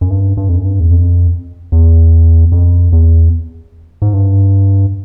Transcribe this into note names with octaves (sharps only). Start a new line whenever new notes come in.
F#2
G2
G2
F2
F#2
G2
E2
F2
E2
F2
E2
G#2
G2